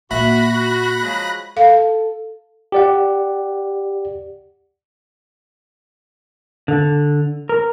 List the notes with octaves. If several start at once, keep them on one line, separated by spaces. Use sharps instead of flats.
A#2 A#3 F#4 E5 B5 F#6 A#6
F3 F#3 G#3
A4 F5
G4 D5 F#5
D3
A#4